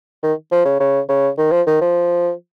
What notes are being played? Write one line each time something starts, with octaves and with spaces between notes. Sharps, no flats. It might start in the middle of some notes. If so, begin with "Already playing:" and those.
D#3
F3
C#3
C#3
C#3
D#3
F3
D#3
F3